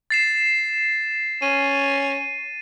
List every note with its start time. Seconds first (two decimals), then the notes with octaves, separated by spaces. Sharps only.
0.10 A6 C7 E7
1.42 C#4 D#7